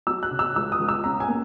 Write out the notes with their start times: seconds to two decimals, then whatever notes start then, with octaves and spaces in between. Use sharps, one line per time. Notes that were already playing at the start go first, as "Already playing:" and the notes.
0.07 F#3 E6
0.23 F#6
0.31 C#3
0.39 E6
0.56 C#2 E6
0.72 D#6
0.80 C#2
0.89 E6
1.04 C#4 A#5
1.20 G#5
1.28 A#3